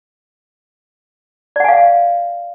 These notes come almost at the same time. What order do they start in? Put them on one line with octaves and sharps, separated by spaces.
D5 F#5 G#5 F5